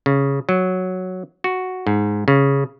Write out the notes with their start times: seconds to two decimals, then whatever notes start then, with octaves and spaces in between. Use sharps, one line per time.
0.06 C#3
0.49 F#3
1.44 F#4
1.87 G#2
2.28 C#3